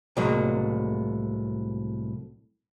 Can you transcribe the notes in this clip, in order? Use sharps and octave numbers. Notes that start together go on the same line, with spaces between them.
C2 A2 F#3 G#3 A#3